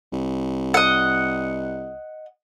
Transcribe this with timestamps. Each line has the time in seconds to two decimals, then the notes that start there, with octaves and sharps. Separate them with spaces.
0.13 C2
0.74 D#5 F#5